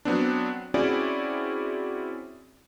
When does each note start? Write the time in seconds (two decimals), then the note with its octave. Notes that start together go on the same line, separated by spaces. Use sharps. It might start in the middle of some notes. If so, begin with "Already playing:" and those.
0.05 F#3 B3 C4 D4
0.74 C4 C#4 E4 F#4 G#4 D5